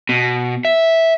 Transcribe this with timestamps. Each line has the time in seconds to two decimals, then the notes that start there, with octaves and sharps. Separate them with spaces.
0.09 B2
0.65 E5